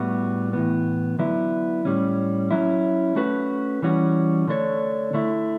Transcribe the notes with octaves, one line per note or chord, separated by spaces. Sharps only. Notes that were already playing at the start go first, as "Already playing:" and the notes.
Already playing: A2 G3 B3 F#4
A2 E3 B3
D3 F#3 B3 E4
A2 G3 C#4
F#3 C#4 E4
A3 C#4 F#4 B4
E3 G3 C#4 F#4
D3 A3 D4 A4 C#5
D3 A3 E4